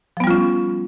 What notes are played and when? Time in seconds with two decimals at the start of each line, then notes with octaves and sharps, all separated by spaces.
0.17 F3
0.20 B3
0.24 G3
0.27 F4
0.31 C#4